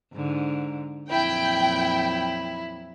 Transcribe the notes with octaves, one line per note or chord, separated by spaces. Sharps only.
G#2 D3
F2 A#2 F#3 E4 G5